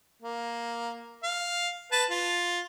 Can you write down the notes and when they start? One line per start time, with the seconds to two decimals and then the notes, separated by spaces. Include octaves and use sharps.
0.22 A#3
1.23 F5
1.92 B4 A5
2.11 F4